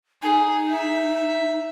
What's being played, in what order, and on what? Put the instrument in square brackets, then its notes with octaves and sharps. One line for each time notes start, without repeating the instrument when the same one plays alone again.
[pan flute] D#4 [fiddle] G#4
[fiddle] E5